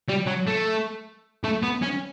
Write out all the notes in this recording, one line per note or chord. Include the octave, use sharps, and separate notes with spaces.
G3
F#3
A3
A3
B3
C#4